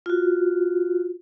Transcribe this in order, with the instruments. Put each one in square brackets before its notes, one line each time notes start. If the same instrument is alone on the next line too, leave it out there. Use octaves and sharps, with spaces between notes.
[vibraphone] F4 F#4